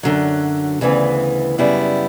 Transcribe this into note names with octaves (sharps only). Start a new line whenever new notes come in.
F#2 D3 F#3
D2 C#3 E3 B3
F#2 C#3 G3 B3 E4